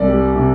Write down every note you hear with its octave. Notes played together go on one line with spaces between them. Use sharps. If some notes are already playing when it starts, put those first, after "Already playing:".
Already playing: C2 D5
G3
C3